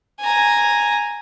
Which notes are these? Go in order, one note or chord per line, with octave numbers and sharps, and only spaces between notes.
G#5 A#5